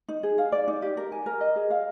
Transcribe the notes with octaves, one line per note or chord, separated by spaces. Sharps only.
D#4
G#4
F5
D5
D#4
G4
A#4
G#5
A#4
D#5
G#4
F5